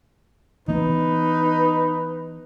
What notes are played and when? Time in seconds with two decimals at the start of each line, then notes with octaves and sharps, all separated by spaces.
0.68 E3 B3 D#4 B4